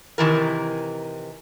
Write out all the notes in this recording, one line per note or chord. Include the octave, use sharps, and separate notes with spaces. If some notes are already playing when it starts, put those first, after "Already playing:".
C3 D#3 E3 A#4